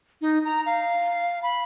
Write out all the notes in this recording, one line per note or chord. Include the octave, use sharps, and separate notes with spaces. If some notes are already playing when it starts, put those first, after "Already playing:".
D#4
A#5
F5
B5